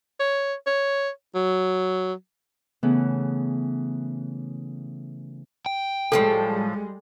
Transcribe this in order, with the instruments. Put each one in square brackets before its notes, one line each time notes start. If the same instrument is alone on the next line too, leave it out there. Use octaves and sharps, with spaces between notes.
[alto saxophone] C#5
C#5
F#3
[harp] C#3 E3 A3 B3
[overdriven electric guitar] G5
[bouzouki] A2 C3 F3 [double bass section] G3 G#3 [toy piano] A4